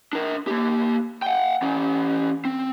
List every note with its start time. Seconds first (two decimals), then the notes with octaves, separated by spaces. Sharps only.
0.13 D4 A#4
0.47 A#3 G4
1.22 F#5 G5
1.62 E3 C#4
2.45 C4